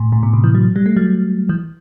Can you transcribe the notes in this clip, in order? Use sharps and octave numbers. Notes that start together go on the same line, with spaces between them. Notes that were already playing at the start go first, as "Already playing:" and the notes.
Already playing: A2
A2
B2
C3
E3
F#3
G3
A3
F#3
E3